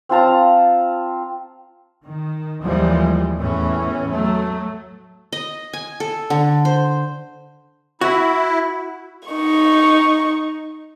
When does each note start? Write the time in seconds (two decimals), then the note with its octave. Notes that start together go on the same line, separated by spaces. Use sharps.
0.09 C4 F4 A5 A#5
2.04 D#3
2.64 D#2 E3 F3 G3 G#3
3.40 E2 A2 E3 C#4
4.09 F#3 A3
5.32 D#5
5.73 G#5
6.00 A4
6.30 D3
6.65 C5
8.01 E4 F#4
9.29 D#4 C#6